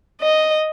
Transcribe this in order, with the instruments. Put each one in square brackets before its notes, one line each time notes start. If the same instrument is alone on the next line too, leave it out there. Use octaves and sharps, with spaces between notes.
[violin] D#5